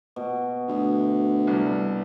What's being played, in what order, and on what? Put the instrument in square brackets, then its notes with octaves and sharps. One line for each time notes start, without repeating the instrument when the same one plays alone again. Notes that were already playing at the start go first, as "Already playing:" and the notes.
[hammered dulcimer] B2
[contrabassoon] D2
[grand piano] C2 G2